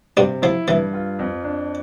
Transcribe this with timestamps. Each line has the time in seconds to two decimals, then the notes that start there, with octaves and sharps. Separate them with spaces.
0.17 G2 C3 G3
0.42 F3 E4
0.68 G2 E3
0.93 F4
1.19 F2
1.44 D4